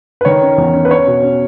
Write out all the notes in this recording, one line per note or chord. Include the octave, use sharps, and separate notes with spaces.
B4
D#3 C#5
C#4
E2
C#4
B4
C#4 C#5
B2
C#4